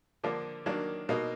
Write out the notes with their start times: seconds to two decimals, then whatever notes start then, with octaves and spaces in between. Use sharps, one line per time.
0.24 D3 F3 A#3 D4
0.66 D#3 F#3 A#3 D4
1.09 B2 A#3 D#4